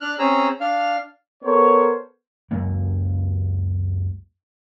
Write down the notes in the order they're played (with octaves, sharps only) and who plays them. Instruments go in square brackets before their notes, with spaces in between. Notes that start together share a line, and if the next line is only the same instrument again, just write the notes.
[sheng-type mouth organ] D4 F6 F#6
C4 C#4 G#4 A#5 E6
D4 F5 F6
[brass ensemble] B3 A4 A#4 C5 C#5
[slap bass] C#2 F#2 F#3 A#3